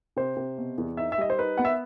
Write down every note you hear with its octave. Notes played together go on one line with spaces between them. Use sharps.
C3 C5
C3
B2
E2
D#4 E5
E5
G3 D#5
C5
D#4 B4
B3 F#5
E5